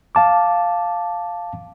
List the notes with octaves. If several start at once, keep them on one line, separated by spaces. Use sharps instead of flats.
F5 A5 D6